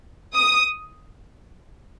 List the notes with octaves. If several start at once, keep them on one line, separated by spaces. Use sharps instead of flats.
D#6